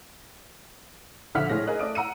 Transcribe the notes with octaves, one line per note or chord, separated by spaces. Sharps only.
A#1 D3 E5 F#5 F6 B6
A2 G#3 A#6
G#4 A#4 D#5 F#6
A3 D5 D#6 D7
F#5 A#5 E6 C#7 D#7